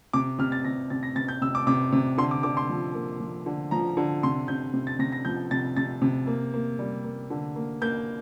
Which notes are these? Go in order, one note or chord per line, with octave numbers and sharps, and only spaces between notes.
C3 D6
C3 F6
A6
C3 A#6
C3 A6
A#6
C3 A6
G6
C3 E6
D6
C3 D6
C3
D3 C6
D6
D3 D6
C6
F3
A#3
F3
D3
F3 A#5
D3
C3 C6
C3 G6
C3
A6
C3 A#6
A#6
F3 G6
C3 A6
C3 A6
C3
A#3
A#3
G3
A#3
D3
A#3
A#3 G6